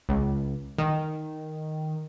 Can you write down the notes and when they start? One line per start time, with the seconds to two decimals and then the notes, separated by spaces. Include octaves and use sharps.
0.09 C#2
0.78 D#3